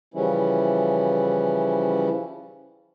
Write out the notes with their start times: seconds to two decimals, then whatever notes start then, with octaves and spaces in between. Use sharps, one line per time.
0.14 C#3 E3 F3 G3 C#4 E4